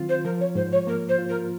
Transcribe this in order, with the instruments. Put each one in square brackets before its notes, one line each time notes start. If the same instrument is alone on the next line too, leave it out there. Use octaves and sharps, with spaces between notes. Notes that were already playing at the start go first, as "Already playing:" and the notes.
Already playing: [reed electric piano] D#3 F#3 C4 F4
[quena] C5
[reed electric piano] F3 [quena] A#4
[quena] C#5
[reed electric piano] G#2 [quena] C5
[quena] C#5
[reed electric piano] A#3 [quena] A#4
[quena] C5
[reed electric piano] F4
[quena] A#4